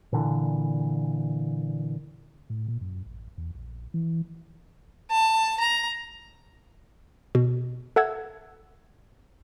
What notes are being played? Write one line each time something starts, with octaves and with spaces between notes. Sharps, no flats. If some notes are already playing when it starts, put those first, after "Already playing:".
A#2 D3 E3
A2
A#2
F#2
A1
E2
A#1
E3
A5
A#5
B2
A4 E5 F#5 E6 G#6